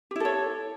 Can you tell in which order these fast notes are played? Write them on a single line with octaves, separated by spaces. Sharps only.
G4 E4 A4 C#5